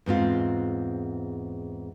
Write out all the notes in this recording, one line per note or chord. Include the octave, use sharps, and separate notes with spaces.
E2 G#2 C4 F4